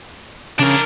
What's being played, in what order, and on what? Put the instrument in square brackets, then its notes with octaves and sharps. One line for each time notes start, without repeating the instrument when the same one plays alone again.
[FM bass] C#3 [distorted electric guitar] D4 A#4